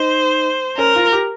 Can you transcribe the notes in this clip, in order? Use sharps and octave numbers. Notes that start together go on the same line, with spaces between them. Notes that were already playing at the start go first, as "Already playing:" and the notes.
Already playing: D#4 C5
C#4 A#4
F4
G4